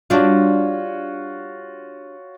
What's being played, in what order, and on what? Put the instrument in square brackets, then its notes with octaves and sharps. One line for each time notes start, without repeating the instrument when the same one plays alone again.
[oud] G3 D4 [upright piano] F4 F#4 C#5